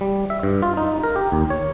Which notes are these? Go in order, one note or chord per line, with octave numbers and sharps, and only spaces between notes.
G3
E5
G2
F4
D#4
A#4
G4
D#2
C#5